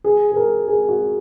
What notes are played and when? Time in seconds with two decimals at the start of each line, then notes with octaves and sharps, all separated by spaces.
0.04 G#4
0.32 G#4
0.36 A#4
0.68 G#4
0.89 F#4